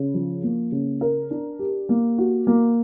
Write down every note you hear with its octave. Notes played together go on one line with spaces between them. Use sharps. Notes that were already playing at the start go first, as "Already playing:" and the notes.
Already playing: C#3
F3
A#3
C#3
A#4
D4
G4
A#3
F#4
A#3